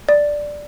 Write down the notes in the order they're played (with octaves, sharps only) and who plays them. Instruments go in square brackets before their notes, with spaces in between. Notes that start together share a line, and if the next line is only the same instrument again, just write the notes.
[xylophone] D5